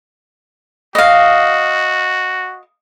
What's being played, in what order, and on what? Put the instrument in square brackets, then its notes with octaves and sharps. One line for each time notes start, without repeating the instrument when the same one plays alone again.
[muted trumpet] F#4 [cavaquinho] D#5 F5